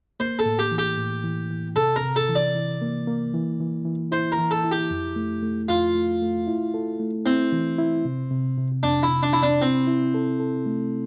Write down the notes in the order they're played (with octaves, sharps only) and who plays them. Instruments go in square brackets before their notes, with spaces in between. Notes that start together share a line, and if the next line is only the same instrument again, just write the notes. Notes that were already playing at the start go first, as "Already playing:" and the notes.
[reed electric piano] A#3 [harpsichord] C5
[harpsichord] A4
[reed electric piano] A2
[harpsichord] G4
[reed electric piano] E3
[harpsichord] G4
[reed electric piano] A2
E3
E3
[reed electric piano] C3 [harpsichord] A4
[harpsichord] A#4
[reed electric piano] C3
[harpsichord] A4
[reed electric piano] E3
[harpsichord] D5
[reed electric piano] E3
A#3
A#3
E3
E3
E3
[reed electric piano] E4 [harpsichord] C5
[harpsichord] A#4
[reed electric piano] E3
[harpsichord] A4
[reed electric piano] E4
[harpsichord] G4
[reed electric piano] F2
A3
A3
[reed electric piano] F2 [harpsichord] F4
[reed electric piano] A3
A3
E4
A4
A3
[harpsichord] C4 [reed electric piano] E4
[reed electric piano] E3
E4
C3
C3
C3
[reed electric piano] F2 [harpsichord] D4
[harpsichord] E4
[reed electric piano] C3
[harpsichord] D4
[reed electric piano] C3 [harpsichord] E4
[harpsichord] D4
[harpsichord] C4 [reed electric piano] E4
[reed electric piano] E4
A4
A4
A3